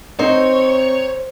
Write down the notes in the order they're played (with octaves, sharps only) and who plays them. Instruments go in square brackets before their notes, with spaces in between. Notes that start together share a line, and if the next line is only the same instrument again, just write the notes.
[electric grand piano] C4 [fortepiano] D#4 [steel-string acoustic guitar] C5 [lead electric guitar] C#5